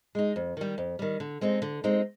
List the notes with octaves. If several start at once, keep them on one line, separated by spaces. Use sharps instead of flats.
G#3 D#4
F2
D#3 G3
F2
D#3 G3
D3
G#3 C4 D#4
D3
G#3 C4 D#4